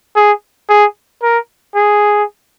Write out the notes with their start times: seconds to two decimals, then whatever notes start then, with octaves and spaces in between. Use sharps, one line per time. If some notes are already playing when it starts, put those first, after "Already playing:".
0.16 G#4
0.69 G#4
1.23 A#4
1.76 G#4